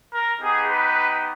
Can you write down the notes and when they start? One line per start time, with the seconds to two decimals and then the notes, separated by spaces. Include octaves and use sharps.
0.13 A#4
0.42 B3 D#4 G4 G#4
0.70 B4